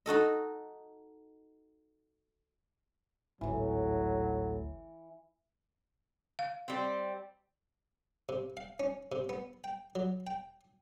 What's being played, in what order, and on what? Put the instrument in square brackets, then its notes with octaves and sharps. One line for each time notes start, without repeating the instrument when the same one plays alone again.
[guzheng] D#4 F#4 A4 D#5
[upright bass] G#1 D2 [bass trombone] A2 [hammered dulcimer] E3 [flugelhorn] F#3
[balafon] F5
[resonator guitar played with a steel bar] G3 C4
[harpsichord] C3
F5
C#4
C3
B3
G5
F#3
G5